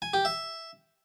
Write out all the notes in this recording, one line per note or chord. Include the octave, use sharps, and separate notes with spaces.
G#5
G4
E5